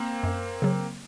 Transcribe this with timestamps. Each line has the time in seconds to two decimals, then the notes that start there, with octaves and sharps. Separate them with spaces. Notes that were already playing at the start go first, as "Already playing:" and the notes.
Already playing: A#3 C4
0.23 F#2
0.62 C#3 F#3